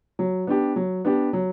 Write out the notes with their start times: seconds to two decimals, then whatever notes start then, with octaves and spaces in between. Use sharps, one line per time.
0.19 F#3
0.47 B3 D4 G4
0.76 F#3
1.05 B3 D4 G4
1.33 F#3